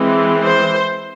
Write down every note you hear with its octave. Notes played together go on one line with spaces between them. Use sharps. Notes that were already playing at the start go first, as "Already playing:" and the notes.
Already playing: E3 G#3 C4
C5